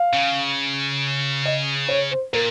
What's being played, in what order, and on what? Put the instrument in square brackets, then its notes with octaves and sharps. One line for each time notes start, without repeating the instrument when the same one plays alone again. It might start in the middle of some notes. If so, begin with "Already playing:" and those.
Already playing: [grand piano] F5
[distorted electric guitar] C#3
[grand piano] D#5
C#5
C5
[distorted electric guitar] A#2 [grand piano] A#4